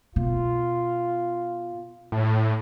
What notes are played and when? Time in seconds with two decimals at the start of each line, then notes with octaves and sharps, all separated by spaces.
0.16 B2 F4
2.12 A2